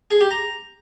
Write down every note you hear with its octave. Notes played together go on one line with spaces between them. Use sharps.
G#4
G4
A#5